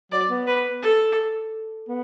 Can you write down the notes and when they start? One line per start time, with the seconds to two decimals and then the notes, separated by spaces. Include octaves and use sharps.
0.12 F#3 D5
0.30 B3
0.47 B4
0.82 A4
1.88 B3